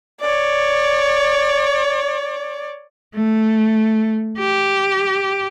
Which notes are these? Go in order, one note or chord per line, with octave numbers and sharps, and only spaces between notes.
C#5 D5
A3
G4